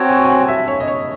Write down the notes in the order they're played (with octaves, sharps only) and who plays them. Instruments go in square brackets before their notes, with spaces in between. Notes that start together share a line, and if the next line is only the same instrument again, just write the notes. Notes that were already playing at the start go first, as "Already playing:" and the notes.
Already playing: [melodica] C4 F#4 C#5 [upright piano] A5
[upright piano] G#5
G#5
F#5
E5
C#5
D#5
C#5